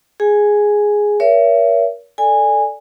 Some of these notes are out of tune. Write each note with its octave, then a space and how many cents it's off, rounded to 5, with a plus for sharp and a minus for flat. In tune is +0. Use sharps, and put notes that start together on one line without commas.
G#4 +0 G#5 +0
A#4 +30 C#5 +30 E5 +35
A4 +5 D5 +0 G#5 -15